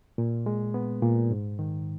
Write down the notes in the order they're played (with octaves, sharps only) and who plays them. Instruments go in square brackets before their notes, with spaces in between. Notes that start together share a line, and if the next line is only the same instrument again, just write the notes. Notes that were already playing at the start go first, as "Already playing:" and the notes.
[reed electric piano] A#2
G#3
B3
A#2
G#2
D#3